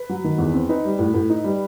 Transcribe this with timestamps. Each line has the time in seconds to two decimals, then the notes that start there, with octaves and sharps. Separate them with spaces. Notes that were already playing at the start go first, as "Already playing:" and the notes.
Already playing: B4
0.09 F#3
0.24 D#3
0.38 E2
0.54 C4
0.69 D#4 B4
0.85 G3
0.99 A2
1.14 A2
1.30 D#4
1.44 G3